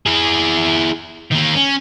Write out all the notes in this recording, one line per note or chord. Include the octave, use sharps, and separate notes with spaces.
E4 G#4
D#3 A#3
C#4